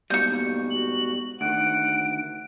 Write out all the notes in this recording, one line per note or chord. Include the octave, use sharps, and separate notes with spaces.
G#2 B2 G3 C#6 G6
A#3
F#4 F#7
D2 D#3 F#5 D7